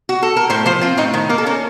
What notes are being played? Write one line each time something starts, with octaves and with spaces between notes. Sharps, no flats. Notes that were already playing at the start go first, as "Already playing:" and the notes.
F#4
A4
A#4
A2 C5
F3 C5
C4 F4
A2 D#4
D#3
A#3 A#4
A4
C#4 A#4